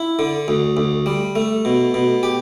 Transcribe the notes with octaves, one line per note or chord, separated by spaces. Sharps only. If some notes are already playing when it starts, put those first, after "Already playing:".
Already playing: E4
D3
D2
D2
G3
A3
B2
B2
G4